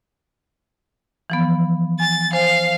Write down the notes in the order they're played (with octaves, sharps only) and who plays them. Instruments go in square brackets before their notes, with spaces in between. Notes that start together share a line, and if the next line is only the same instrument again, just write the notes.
[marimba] E3 F3 B3
[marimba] G#5 [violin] A6
[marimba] C5 G#5 [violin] F5